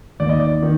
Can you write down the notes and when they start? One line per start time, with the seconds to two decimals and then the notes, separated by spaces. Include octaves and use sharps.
0.20 D#2 D5
0.29 D#5
0.40 D5
0.62 D#3